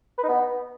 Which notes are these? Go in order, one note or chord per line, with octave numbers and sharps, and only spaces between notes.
B4
D#4
B3